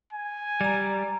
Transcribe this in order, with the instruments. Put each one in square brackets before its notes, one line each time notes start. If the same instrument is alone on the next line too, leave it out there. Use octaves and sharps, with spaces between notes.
[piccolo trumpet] G#5
[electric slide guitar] G3 [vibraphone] D5 A#5